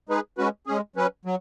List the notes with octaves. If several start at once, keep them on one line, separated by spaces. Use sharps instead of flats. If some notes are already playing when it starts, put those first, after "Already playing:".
G#3 D#4 G#4 B4
G#3 C#4 F#4 B4
G#3 C#4 G#4
F#3 C#4 B4
F#3